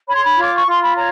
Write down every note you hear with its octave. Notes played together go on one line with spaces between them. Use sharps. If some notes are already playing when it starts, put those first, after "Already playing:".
C#5 B5
C6
B5
F4
D6
C#6
F4 C6
B5
C#5 A#5